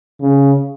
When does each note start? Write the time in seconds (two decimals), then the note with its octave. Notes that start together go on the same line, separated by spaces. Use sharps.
0.20 C#3